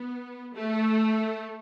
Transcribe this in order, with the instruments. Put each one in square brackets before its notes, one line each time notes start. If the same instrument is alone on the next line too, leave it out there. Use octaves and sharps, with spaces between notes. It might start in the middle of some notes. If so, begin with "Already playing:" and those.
Already playing: [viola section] B3
A3